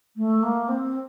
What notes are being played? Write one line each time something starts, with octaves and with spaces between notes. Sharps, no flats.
A3
A#3
C4